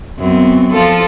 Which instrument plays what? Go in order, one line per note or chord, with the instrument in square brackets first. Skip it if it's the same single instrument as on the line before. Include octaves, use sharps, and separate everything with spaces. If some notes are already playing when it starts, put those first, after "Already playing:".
[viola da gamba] F#2 B3 C4
F3 F4 A4